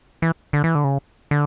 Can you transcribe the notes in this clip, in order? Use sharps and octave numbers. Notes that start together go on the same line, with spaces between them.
E3
D3
E3
D3
C#3
D3